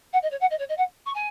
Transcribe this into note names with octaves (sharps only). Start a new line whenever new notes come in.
F#5
D#5
C#5
F#5
D#5
C#5
D#5
F#5
C#6
G#5